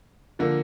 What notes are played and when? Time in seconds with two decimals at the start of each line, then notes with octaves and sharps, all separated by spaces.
0.39 D3 F3 A#3